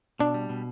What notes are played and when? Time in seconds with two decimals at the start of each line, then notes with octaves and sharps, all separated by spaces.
0.19 B2 D4
0.34 G3
0.49 B2